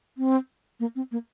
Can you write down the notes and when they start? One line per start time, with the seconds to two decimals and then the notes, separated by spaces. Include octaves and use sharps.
0.17 C4
0.80 A#3
0.96 C4
1.12 A#3